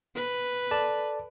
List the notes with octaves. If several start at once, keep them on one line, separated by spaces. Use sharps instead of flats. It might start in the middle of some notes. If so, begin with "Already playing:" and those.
B4
A4 D5 A5